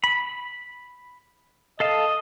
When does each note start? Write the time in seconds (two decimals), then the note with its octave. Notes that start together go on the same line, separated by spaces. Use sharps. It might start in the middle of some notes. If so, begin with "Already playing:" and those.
0.04 B5
1.80 A4 D#5 F5 A5